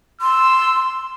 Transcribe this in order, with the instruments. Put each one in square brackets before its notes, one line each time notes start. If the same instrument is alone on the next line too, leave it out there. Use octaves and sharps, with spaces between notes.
[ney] C6 [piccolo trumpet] E6